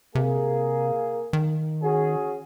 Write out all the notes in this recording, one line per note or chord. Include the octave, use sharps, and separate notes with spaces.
C3 A#3 G#4
D#3
C#4 F#4 G#4